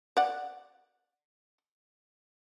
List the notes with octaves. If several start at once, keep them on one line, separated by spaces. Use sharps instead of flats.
D5 F#5